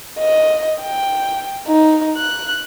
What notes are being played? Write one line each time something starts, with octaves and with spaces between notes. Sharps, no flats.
D#5
G5
D#4
F#6